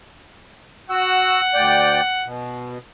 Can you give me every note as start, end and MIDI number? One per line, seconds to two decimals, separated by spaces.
0.90 1.41 66
0.90 2.28 78
0.90 1.41 88
1.54 2.01 38
1.54 2.01 74
1.54 2.01 79
2.25 2.78 47